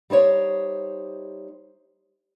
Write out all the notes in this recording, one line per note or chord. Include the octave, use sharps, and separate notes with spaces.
G3 D#4 C5 C#5 E5